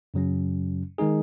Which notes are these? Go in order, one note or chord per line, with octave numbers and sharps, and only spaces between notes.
F#2 C#3 F#3 C#4
D#3 G#3 D#4 G#4